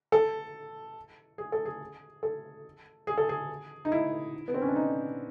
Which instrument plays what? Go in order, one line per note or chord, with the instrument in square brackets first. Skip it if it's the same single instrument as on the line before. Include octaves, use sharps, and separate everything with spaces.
[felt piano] A4
G#4
A4
G#4
A4
G#4
A4
G#4
D#4
E4
B3
C4
C#4
D4
D#4